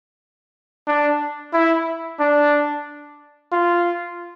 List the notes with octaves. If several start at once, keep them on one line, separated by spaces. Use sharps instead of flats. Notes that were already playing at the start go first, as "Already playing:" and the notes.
D4
E4
D4
F4